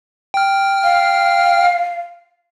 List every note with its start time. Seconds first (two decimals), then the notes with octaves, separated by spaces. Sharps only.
0.34 G5 F6
0.84 F5